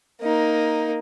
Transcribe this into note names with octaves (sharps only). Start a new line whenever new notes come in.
A#3 D#4